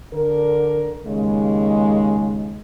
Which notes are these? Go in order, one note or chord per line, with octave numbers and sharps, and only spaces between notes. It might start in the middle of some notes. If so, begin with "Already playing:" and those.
D3 A#4
D#2 C#3 G#3